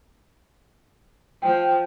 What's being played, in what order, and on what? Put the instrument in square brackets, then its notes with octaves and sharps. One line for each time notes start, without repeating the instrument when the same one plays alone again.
[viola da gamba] F3 [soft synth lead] G5